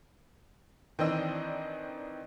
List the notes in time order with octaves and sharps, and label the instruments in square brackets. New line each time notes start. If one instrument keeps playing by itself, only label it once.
[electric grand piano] D#3 E3 D#5 [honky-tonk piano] C4 D4 E6